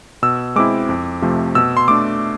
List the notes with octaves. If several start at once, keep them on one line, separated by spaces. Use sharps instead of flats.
B2 E6
G#3 C4 E4 D6
F2
C3 F3 A3
B2 E6
C6
A3 D4 D6